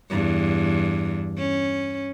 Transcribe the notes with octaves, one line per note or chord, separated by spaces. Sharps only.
E2 G2
C#4